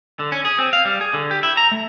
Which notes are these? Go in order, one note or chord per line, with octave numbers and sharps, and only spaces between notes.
D3
C#4
G#4
C4
F5
G3
G#4
D3
G4
E4
A#5
A3